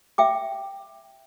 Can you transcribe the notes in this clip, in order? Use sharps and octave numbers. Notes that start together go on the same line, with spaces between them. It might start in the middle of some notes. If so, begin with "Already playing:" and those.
E5 G5 D6